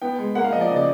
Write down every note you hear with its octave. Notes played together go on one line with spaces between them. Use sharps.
B3 G5
G#3
A#3 F#5
F5
F3 D#5
D5
C#3 D#5
D5